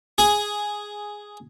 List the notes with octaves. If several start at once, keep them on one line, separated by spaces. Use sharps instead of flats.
G#4